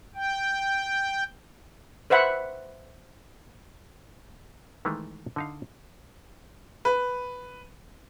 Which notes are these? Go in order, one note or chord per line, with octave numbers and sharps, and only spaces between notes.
G5
B4 C5 E5 F#5 B5
D#3 E3 G#3 A3
D3 D#4 F5
B4